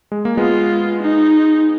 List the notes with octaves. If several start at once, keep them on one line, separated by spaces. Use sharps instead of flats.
G#3
A#3
G#3 B3 F4
D#4